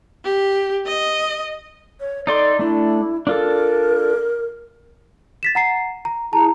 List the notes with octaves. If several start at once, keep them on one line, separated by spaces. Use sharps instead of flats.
G4
D#5
C#5
D#4 A4 D5 C6
A3 D4 E4
D4 F4 A4 A#4
A6 B6 E7
F#5 A#5 C7
A#5
E4 G#4 A5 A#5